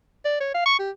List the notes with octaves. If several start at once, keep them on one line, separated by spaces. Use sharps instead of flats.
D5
C#5
F5
C#6
G4